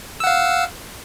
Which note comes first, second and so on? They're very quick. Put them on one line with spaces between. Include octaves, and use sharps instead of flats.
E6 F#5 F5